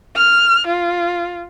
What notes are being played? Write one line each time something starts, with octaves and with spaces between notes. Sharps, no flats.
F6
F4